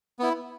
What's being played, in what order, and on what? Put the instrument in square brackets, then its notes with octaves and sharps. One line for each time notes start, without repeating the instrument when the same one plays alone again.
[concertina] B3 E4